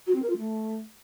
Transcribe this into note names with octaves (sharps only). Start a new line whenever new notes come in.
F#4
C4
A#4
F4
A3